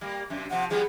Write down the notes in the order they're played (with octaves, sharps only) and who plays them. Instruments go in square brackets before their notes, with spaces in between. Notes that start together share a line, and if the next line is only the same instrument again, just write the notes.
[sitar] G3 A#3
F#2 C3
[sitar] C3 F3 [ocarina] F#5
[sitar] F3 G3 B3 [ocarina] G#4